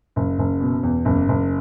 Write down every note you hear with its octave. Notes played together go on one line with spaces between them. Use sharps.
F#1
F#1
B2
E2
F#1
F#1